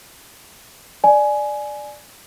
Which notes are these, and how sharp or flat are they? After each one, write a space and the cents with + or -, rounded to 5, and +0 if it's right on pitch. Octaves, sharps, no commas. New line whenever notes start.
D5 +10 G#5 +15